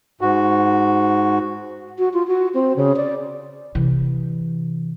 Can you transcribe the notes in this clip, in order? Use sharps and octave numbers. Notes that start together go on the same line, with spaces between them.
G#2 F#4
F#4
F4
F#4
C4
C#3
D5
C3 E3